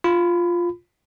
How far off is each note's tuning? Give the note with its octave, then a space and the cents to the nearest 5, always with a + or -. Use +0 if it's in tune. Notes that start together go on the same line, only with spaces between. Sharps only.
F4 +0 B5 +20